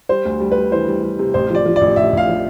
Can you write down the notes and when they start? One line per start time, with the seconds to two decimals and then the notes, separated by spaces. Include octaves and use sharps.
0.09 G3 C5
0.25 D2
0.40 G3
0.51 B4
0.57 G3
0.72 E3 C5
0.88 G3
1.03 G3
1.19 C3
1.34 A1 C5
1.50 F3 D5
1.66 F3
1.76 D5
1.81 A1
1.96 A1 E5
2.13 A1 F5
2.28 F3